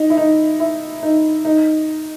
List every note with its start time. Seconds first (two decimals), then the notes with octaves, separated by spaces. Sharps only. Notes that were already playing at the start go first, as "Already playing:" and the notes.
Already playing: D#4
0.10 E4
0.17 D#4
0.60 E4
1.03 D#4
1.45 D#4